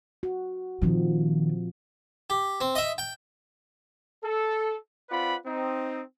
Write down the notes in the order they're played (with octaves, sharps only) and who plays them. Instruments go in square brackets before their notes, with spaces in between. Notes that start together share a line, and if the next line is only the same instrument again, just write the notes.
[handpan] F#4
[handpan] A#2 F3 C4 [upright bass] D#3
[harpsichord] G4
C4
D#5 E5
G5
[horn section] A4
C4 F4 B4 D5 F#5 B5
C4 D#4